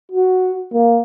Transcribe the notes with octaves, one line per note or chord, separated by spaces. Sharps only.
F#4
A#3